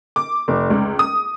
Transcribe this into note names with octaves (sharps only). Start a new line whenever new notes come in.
D6
F1
C#2
D#6